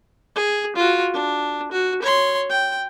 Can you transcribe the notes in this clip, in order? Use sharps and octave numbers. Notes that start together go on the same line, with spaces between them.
G#4
F4 F#4
D4
F#4
C#5 C6
G5